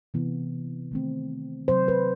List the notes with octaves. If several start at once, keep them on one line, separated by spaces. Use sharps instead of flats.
C3 E3 B3
D#3 A3 C4
C3 F#3 C4 C5
B4